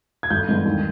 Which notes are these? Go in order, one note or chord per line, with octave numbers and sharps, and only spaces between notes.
G#6
G1 G6
G2 E3 G#3 B3
D#2